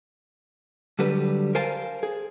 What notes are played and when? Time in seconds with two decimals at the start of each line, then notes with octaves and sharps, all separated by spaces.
0.99 D3 F#3 G3 B4
1.55 A#4 C5 F5 G#5 A5
2.03 G#4